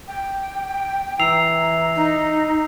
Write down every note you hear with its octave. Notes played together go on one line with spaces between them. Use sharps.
G5
E3 A#5 E6 C7 F7
D#4